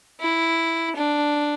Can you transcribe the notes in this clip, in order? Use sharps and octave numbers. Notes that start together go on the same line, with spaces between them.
E4
D4